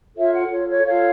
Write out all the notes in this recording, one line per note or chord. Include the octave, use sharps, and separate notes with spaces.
F4 A4 C#5 E5
F#5
F4 A4 C#5
C#5
F4 A4 C#5 F5